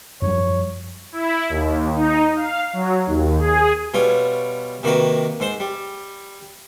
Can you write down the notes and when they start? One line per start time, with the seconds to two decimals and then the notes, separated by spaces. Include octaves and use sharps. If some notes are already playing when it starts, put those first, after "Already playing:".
0.22 F#2 F3 G3 C#5
1.12 E4
1.49 D#2
1.96 D#4
2.36 F5
2.73 F#3
3.06 D#2
3.38 G#4
3.94 B2 G3 F4 C#5
4.83 C3 D#3 A#3 F#4 B4
5.40 G#2 C5 C6
5.60 G3